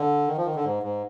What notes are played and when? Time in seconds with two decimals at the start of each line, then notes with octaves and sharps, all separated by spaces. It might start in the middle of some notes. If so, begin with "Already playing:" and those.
Already playing: D3
0.27 D#3
0.37 F3
0.46 D#3
0.55 D3
0.64 G#2
0.83 G#2